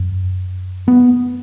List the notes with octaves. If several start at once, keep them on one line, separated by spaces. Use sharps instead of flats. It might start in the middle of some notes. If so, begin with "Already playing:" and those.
Already playing: F#2
B3